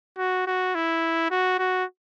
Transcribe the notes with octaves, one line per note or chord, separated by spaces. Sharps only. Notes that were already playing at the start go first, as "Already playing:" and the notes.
F#4
F#4
E4
F#4
F#4